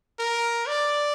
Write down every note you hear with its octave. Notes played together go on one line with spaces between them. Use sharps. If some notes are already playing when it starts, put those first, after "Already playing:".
A#4
D5